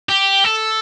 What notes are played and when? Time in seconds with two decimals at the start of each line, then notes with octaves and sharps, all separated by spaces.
0.09 G4
0.44 A4